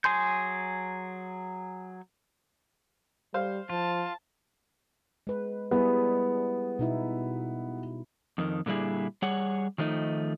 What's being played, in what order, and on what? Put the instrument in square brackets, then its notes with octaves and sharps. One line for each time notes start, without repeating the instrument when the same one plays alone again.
[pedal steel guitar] F#3 G#4 G#5 C6 G6
[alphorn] G3 [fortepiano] C5 F5
[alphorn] F3 [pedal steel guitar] F4 [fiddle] A5
[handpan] G#3 B4
[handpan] G3 E4 G#4 [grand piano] B3
[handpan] B2 D#4 E4
[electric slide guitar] F2 D#3
A#2 D3 G3 E4 G#4
G3 G#4 C#5 F#5
D#3 F3 A3 D#4